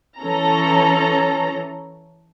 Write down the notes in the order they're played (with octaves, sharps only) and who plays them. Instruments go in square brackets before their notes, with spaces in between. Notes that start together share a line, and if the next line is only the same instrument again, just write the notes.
[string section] E3 C#4 A4 A#5